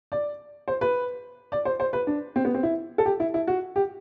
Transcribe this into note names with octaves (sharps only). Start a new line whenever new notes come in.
D5
C5
B4
D5
C5
C5
B4
D4
C4
B3
C4
E4
A4
G4
E4
E4
F#4
G4